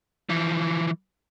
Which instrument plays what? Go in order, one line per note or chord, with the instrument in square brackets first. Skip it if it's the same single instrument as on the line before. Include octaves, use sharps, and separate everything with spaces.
[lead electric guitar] E3 F3